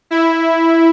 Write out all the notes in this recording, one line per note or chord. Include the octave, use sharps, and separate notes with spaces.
E4